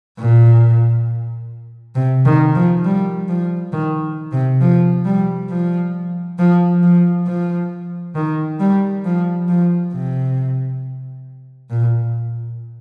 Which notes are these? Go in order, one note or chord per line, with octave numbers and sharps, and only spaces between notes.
A#2
C3
D#3
F3
G3
F3
D#3
C3
F3
G3
F3
F3
F3
F3
D#3
G3
F3
F3
C3
A#2